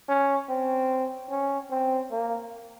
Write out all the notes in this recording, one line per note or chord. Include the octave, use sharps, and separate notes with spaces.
C#4
C4
C#4
C4
A#3